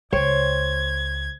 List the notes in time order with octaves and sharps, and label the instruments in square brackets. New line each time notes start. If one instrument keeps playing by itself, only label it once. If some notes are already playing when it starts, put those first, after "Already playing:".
[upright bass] C#2 [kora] C5 C#5 G5 [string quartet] G#6